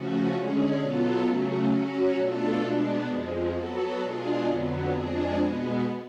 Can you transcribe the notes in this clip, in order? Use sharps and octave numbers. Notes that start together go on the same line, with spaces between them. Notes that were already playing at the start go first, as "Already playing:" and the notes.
Already playing: C#3 F3 A3 C#4 F#4
D3 G#3 C#4 G#4
B2 F#3 B3 F4 A4
C#3 F#3 A3 C#4
F#3 C#4 F#4
B2 A3 D4 F4 A4
B2 G#3 B3 D4
F2 F3 G#3
F#3 B3 F#4 A4
B2 G#3 D4 F4 G#4
F2 D3 F#3 B3
F2 F3 G#3 D4 G#4
B2 G#3 B3